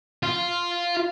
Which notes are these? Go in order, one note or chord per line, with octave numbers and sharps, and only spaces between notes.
F4